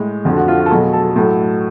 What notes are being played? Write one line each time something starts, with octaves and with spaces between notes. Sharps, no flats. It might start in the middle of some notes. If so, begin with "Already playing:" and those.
Already playing: A2 G#3
F2 D3 F3 F#4
F#4
F4
F#4
A4
B2 F#3 A3 G#4
A4
A2 F#3 A3